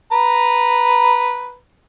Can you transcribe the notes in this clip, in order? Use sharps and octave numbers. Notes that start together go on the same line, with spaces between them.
B4 A#5